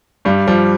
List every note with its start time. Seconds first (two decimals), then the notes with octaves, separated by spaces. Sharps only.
0.25 G2 G3
0.47 F3 G3